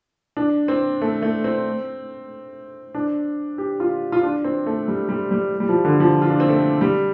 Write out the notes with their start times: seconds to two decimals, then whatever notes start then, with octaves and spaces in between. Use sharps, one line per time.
0.37 D4
0.68 C4
1.01 A3
1.22 A3
1.44 C4
2.95 D4
3.58 G4
3.80 F4
4.12 F4
4.23 D4
4.44 C4
4.66 A3
4.88 G3
5.09 G3
5.31 G3
5.60 G3
5.69 F3
5.85 D3
6.00 F3
6.22 F4
6.30 D4
6.40 C4
6.49 A3
6.81 G3